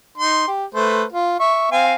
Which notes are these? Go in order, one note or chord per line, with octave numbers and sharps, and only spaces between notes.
D#4 C6
G4
A3 B4 C5
F4
E5 C#6
C4 F5 G#5